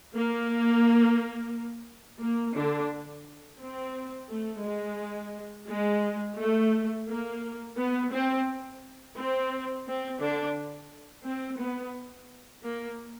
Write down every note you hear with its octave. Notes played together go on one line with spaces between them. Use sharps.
A#3
A#3
D3 D4
C4
A3
G#3
G#3
A3
A#3
B3
C4
C4
C4
D3 D4
C4
B3
A#3